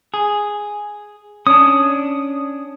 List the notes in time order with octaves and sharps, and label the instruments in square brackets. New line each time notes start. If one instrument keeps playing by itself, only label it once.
[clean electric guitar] G#4
[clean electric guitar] C#4 D4 [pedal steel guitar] D#6